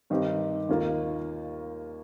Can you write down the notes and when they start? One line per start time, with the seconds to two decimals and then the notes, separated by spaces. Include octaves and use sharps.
0.10 G2 D#3 C4 D#4 G4
0.69 D#2 D#3 A#3 F4